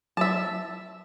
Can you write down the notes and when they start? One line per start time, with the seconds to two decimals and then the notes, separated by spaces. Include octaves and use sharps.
0.17 F#3 E5 A5